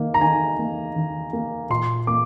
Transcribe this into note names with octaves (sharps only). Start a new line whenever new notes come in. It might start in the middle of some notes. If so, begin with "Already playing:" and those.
Already playing: D#3 A#3
A#5
D#3 G#5
A#3
D#3
A#3
A#2 C6
A#3 D6